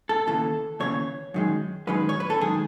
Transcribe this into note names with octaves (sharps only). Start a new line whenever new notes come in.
A4
D#2 C#3 E3 A4
D#2 C#3 E3 C#5
F#2 D#3 G#3
F#2 D#3 G#3 B4
C#5
B4
A4
F#2 D#3 G#3 G#4